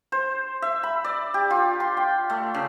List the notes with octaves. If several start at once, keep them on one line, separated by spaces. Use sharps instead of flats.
C5
E5
B5
D5
G4
F4
C6
G5
A3
C#3